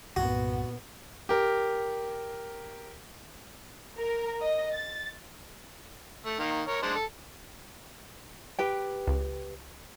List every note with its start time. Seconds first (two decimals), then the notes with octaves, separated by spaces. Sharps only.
0.16 C2 G2 A#2 B3 F#4
1.29 G4 A#4
3.98 A#4
4.41 D#5
4.73 A6
6.26 A3
6.40 D#3 A#3
6.68 A#4 C#5
6.83 G#3 D4 C5
6.96 A4
8.59 G4 B4 G5
9.07 C#2